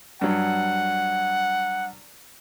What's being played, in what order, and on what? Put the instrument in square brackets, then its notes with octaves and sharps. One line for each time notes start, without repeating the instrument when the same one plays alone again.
[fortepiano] G2 F#3 [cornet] F#5